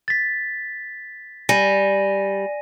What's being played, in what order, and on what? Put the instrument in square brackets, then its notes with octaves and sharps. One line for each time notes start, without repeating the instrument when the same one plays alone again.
[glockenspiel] A6 B6
[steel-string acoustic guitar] G3 [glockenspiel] G#5 A#6 D#7